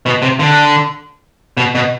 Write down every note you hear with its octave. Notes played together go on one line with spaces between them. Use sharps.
B2
C3
D3
B2
B2